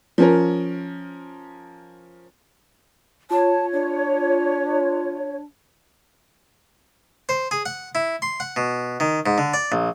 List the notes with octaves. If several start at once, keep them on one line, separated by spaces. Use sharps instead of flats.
F3 C#4 A#4
F4 C#5 A5
D4
C5
G#4
F#5
E4
C6
F#5
B2
D#3
G#2
D3
D5
A#1